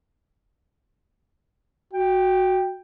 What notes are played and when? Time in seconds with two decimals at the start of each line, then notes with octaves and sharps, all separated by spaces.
1.94 F#4 G5